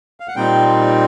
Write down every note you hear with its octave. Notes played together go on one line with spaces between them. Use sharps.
F5
F#5
A#2 G3 C4 D#4 G5